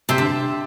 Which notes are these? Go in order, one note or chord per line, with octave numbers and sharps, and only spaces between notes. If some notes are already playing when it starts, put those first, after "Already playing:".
C3 G4 C5 E5 A5
D3